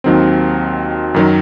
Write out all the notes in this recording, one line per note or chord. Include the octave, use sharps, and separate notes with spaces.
D#2 D#3 F#3 C4
F#2 D#3 F#3